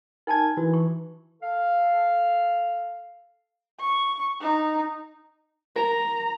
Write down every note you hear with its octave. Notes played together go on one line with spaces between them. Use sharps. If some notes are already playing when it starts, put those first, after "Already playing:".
D#4 A#4 G#5 A5 G#6
E3 F#4
C#6
A4 F5
C#6
D#4
A#4 A#5